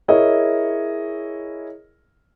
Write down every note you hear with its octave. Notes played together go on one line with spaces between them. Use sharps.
E4 G#4 A#4 C#5 D#5